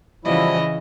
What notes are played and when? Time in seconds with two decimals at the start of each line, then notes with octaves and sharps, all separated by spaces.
0.25 C#3 E3 F3 G3 E4 D#5